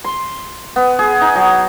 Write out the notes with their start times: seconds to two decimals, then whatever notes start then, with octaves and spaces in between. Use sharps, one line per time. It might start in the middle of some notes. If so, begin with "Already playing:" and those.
0.04 C6
0.76 B3
0.99 G#4
1.21 D#4
1.35 F#3